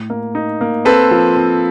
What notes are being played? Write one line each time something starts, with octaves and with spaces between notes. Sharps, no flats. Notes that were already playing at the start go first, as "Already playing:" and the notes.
Already playing: A2
A#3
D#4
A#3
C4 A4 B4
F3
C4